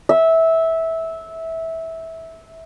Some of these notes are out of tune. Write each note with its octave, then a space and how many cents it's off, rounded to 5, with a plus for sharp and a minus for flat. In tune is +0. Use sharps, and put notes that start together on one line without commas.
E5 -15